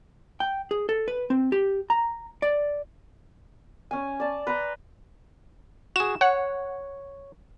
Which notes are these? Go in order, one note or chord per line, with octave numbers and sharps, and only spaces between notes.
G5
G#4
A4
B4
C4
G4
A#5
D5
C#4 G#5
D5 A5
B4 A#5 C6
F#4 G#4 E7
C#5 F#5